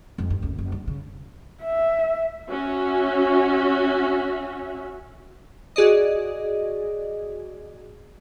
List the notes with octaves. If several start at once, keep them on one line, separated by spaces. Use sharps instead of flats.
F2 G#3
G2
F#1 D2
F#1
G2
C#3
E5
C#4 F#4 E5
F#4 G#4 D5 D#5